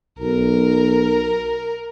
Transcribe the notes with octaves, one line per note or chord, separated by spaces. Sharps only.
B1 A#4